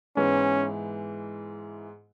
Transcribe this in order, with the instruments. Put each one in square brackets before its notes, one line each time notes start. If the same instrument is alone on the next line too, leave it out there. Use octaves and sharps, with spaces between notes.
[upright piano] G#2 E3 G#3 B3 E4 [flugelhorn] C#4